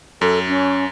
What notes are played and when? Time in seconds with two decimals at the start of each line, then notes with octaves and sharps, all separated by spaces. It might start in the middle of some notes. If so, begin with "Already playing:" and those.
0.21 F#2 A4
0.48 C#4